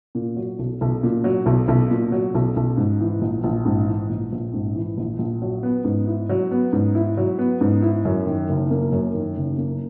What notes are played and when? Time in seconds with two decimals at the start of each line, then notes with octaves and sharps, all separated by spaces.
0.15 A#2
0.37 F#3
0.59 B1
0.81 B1
1.03 A#2
1.24 F#3
1.46 B1
1.68 B1
1.91 A#2
2.12 F#3
2.34 B1
2.56 B1
2.77 G#2
3.00 E3
3.21 A#1
3.44 A#1
3.65 G#2
3.87 E3
4.09 A#1
4.32 A#1
4.53 G#2
4.75 E3
4.97 A#1
5.19 A#1
5.42 F#3
5.63 B3
5.85 G#2
6.07 E4
6.29 F#3
6.51 B3
6.73 G#2
6.95 E4
7.17 F#3
7.39 B3
7.61 G#2
7.82 E4
8.05 F#2
8.27 D#3
8.49 F#1
8.71 A#3
8.92 F#2
9.14 D#3
9.36 F#1
9.58 A#3